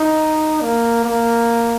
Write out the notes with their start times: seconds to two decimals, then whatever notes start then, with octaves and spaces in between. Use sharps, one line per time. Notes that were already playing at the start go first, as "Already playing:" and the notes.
Already playing: D#4
0.61 A#3
1.04 A#3